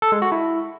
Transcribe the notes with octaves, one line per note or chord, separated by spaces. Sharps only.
A4
G#3
F#4
E4